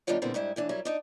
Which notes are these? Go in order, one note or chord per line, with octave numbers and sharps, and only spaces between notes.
D#3 G3 B3 D4 F4 C#5
A#2 D3 E3 G3 B3 C4
G#2 G3 D4 E4
A2 E3 D4
F#3 G3 E4 A#4
D4 D#4 D5